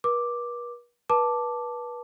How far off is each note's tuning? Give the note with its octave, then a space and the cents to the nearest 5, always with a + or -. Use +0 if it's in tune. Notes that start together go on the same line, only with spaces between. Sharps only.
B4 -45 D6 +0
B4 -30 A5 +0 D6 +0